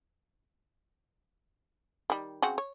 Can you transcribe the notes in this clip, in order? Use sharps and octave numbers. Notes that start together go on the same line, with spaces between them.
D#3 G3
C#3 C4 F#4
C#5